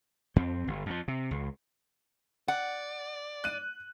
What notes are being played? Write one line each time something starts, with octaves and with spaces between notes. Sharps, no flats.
F2 C4
G1
F2 F3
C3
C#2
D5 F#5
F#6 D#7